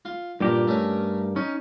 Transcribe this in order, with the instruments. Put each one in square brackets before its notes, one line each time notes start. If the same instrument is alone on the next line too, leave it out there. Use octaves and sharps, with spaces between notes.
[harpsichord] F4
[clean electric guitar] G2 G4 A#4 [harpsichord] A#2
[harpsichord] A3 C#4
[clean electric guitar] C#4 [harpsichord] D#4